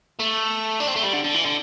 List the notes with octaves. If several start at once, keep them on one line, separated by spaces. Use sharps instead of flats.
A3
D4
C4
A3
G3
D3
D3
E3
D3